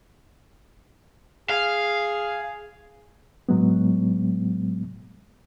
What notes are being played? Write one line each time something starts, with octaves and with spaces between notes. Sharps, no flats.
G#4 F5
A2 F#3 G#3 B3